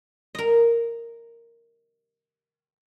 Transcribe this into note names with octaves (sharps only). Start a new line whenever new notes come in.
A#4 D#5